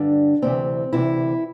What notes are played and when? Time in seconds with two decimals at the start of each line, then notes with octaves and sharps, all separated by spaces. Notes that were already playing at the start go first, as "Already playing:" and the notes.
Already playing: G2 D3 D4
0.42 D2 C3 E3 C4
0.93 D2 C3 E3 E4